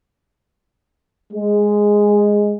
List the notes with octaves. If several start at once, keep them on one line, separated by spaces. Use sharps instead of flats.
G#3